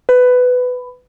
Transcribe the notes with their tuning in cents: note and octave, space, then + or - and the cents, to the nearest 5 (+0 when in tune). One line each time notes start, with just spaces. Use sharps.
B4 +15